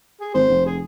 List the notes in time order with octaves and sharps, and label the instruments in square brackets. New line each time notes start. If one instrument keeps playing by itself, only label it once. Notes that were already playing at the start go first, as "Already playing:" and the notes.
[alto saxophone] G#4
[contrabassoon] G#1 [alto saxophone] C5
[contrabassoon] F1
[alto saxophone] G#4